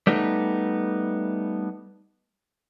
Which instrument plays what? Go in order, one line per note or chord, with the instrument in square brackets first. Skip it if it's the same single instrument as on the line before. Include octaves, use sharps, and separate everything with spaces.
[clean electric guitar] G3 A3 B3 D#4